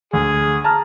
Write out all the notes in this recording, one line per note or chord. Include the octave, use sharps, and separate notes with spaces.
D2 G#4
A5 A#5 F6